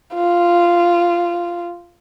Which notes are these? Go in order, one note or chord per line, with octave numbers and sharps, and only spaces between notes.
F4